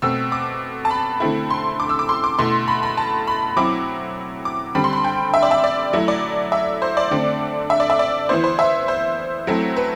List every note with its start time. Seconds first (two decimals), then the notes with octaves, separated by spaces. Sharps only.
0.02 B2 A3 C4 E6
0.32 D6
0.85 A5
0.90 B5
1.20 D3 A3 C4 E4
1.50 C6
1.80 D6
1.89 E6
1.99 D6
2.09 C6
2.24 D6
2.39 B2 A3 E4 C6
2.68 B5
2.83 B5
2.97 A5
3.27 B5
3.56 F#3 C4 E4 D6
4.45 D6
4.75 D3 G3 C4 B5
4.84 C6
4.93 B5
5.04 G5
5.34 E5
5.43 D5
5.51 E5
5.64 D5
5.93 F#3 A3 E4
6.08 D5
6.52 E5
6.82 C5
6.97 D5
7.11 D3 A3 C4
7.70 E5
7.80 D5
7.90 E5
7.99 D5
8.29 E3 B3 E4 C5
8.44 C5
8.59 E5
8.88 C5
9.47 F#3 A3 C4 E4
9.77 B4